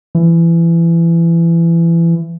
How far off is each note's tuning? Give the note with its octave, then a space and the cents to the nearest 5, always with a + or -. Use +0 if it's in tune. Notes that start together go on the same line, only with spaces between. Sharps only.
E3 +25